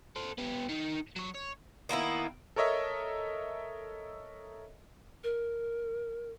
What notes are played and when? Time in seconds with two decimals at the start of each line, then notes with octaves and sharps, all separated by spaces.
0.16 A4 C5
0.38 B3 G4
0.69 D#3 D#4
1.16 F#3 C#5
1.35 C#5
1.89 D#3 A#3 B3 E4
2.56 A4 A#4 C#5 D#5 E5
5.24 A#4